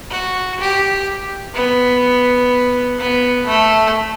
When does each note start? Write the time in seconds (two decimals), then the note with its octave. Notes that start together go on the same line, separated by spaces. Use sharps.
0.10 F#4
0.59 G4
1.55 B3
2.98 B3
3.46 A3